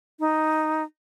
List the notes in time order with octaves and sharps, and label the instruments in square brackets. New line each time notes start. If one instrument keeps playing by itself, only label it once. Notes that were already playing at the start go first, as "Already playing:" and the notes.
[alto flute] D#4